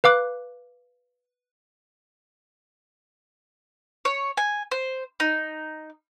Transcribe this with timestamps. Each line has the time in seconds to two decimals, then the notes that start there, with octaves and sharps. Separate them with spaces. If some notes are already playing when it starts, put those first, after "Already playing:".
0.04 B4 F5 D6 F#6
4.05 C#5
4.37 G#5
4.71 C5
5.20 D#4